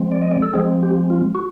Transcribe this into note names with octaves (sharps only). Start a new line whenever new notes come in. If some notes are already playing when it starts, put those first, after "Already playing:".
Already playing: F3 G#3 C4
D5
D#5
D5
A4
F3 G#3 C4 G#4
G4
F4
F#4